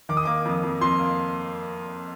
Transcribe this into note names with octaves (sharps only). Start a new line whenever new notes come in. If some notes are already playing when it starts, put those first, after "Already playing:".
D#3 D6
D#6
A#3 D6
F2
F2
F2 C6
A#3